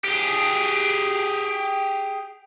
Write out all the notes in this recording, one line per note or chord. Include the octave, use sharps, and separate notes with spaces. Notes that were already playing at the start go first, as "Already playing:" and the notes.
G4 G#4